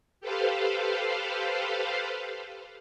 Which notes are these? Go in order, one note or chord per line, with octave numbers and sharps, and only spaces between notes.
G4 A4 B4 C5 F5